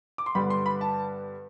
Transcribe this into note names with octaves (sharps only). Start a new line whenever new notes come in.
D6
C6
G2 D3 G3 B3 B5
C6
B5
A5